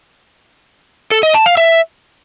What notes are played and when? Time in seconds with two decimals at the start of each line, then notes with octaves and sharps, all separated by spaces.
1.11 A4
1.23 D#5
1.34 A5
1.46 F5
1.57 E5